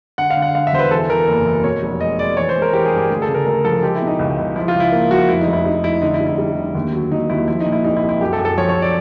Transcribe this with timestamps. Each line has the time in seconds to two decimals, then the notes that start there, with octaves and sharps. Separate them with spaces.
0.18 D3 F#5
0.30 F5
0.37 D3
0.42 F#5
0.54 D3 F5
0.67 E5
0.73 E1 C5
0.79 B4
0.91 E3 A4
1.09 E3 A#4
1.28 F#1
1.46 E3
1.64 B2 C#5
1.83 F1
2.01 G#3 D#5
2.19 G#3 D5
2.37 E3 C#5
2.49 C5
2.55 G#3
2.62 A#4
2.73 E3 G4
2.86 G#4
2.92 G2
2.98 G4
3.10 D2 G#4
3.22 A4
3.28 C#3
3.35 A#4
3.46 D2 A#4
3.65 F3 A4
3.82 G#3 G4
3.96 E4
4.02 B2
4.07 D#4
4.19 C#2
4.38 C#2
4.56 F3 E4
4.68 F4
4.74 C#2
4.80 E4
4.92 A#3
5.11 F3 F#4
5.29 F1 E4
5.41 D#4
5.47 F1
5.53 E4
5.65 F1 D#4
5.84 F1 E4
6.02 D3 D#4
6.14 E4
6.20 F1
6.26 E4
6.38 G3
6.57 D3
6.75 D#2
6.93 F#3
7.12 D#2 D#4
7.30 D#2 E4
7.48 F3 E4
7.60 D#4
7.66 A#2
7.72 E4
7.84 C2 D#4
7.97 E4
8.03 C2
8.09 E4
8.21 F#2 G4
8.33 A4
8.39 F#2
8.45 A4
8.57 F3 C#5
8.69 C#5
8.76 F3
8.82 D5